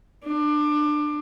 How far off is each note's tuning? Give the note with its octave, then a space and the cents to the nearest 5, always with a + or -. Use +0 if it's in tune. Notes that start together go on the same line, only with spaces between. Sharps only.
D4 +25